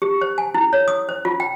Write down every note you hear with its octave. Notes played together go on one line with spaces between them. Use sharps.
G4
C5
G#5
E4
C#5
D#6
C5
F4
G5